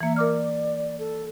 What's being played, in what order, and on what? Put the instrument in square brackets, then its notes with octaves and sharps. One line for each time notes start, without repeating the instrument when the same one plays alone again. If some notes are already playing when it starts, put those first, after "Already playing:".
[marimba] E3 A#3 [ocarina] E5
[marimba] A#4 D6 F6 [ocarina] D5
[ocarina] A4